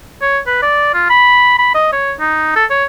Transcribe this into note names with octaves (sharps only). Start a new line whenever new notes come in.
C#5
B4
D5
F4
B5
B5
D#5
C#5
D#4
A4
C#5